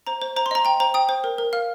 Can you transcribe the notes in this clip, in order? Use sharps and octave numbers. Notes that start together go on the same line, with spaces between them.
C5 A#5
C5
C5 A#5
C6
D#5 A#5
G5 A#5
C5 A#5
G5 D#6
C5
A#4
A#4
F5 F6